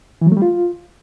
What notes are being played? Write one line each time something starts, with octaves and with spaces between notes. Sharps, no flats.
E3
F#3
A3
G3
F4